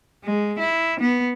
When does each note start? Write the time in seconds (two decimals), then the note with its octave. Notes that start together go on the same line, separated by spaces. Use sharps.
0.24 G#3
0.59 E4
1.00 B3